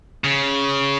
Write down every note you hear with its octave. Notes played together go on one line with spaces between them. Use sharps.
C#3